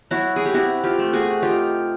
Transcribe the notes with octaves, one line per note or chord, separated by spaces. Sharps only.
F#3 E4 F#4
G#4
G4
C3 E4 F#4
F4 G4
A3
F#4 G#4
D#4 F4 G4